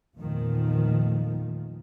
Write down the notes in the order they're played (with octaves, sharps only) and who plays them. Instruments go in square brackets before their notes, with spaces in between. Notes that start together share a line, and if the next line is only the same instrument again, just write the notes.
[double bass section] E2 A#2 D#3 F3 A3